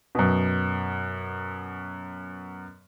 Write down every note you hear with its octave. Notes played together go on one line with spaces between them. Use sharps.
F#2 B2